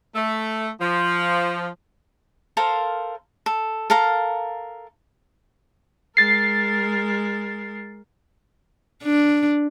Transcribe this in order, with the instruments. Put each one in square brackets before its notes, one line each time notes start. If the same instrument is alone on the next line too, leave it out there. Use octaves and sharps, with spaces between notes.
[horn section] A3
F3
[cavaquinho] A4 A#4 C5 F5
A4
A4 A#4 F5 A#5
[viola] G#3 A#4 [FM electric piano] A6 C7
[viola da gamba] D4